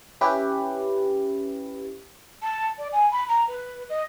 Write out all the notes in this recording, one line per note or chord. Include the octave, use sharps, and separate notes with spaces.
C#4 E4 G4 B4
A5
D5
G#5
B5
A#5
B4
D#5